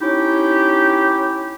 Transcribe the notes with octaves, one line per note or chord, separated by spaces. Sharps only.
C#4 D#4 E4 G4